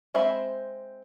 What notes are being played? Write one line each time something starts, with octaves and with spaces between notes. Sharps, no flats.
G#3 C4 C5 E5 B5